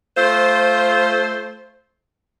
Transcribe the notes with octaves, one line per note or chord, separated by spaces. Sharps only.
A3 F4 C5